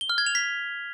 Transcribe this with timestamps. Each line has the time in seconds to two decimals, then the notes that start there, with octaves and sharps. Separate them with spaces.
0.01 G7
0.10 F6
0.18 G#6
0.26 F7
0.35 B6